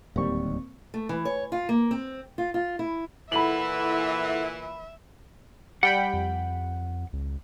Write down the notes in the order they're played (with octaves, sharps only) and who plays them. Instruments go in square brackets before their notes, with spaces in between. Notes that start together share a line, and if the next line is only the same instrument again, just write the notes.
[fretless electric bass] D1 D#2 G3 [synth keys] A#3 C4 C#6
[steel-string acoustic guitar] A3
E3
C#5
F4
A#3
C4
F4
F4
E4
[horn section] A#2 E3 [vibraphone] E4 A4 F#5 [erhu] E5 [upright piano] B5 F#7
[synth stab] G3 G5 B5 [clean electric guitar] F#5
[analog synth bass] F2
C#2